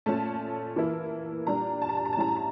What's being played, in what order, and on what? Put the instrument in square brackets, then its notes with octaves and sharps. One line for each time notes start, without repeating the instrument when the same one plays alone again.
[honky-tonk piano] A#2 A3 C#4 A5
E3 A#3 E4
A#2 G3 D4 A#5
A5
A#5
A5
A#5
A5
A2 G3 C#4 E4 A#5
A5
A#5